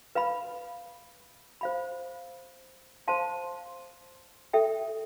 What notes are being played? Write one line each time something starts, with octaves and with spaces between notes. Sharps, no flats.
B4 F5 B5
C5 F5 B5
C5 F5 A5 C6
A4 E5 G5